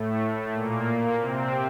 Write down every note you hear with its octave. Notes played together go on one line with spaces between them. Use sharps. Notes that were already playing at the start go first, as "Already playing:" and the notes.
Already playing: A2 A3
A#2 A#3
C3 C4